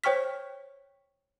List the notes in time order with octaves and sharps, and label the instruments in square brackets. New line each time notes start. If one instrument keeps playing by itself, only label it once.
[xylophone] C5 C#5 G5 C#6 F6 B6